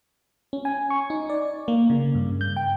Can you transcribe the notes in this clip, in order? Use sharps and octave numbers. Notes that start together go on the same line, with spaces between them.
C#4
G#5
C#6
D#4
D5
A#3
C#3
G2
G6
G5